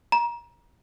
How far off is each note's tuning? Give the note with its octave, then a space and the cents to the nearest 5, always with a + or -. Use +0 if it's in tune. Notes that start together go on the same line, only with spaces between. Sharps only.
A#5 +30